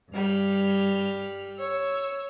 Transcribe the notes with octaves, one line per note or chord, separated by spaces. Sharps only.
G2 G3 F6
C#5 E6